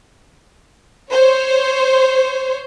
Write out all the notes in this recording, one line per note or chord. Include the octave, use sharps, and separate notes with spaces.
C5 C#5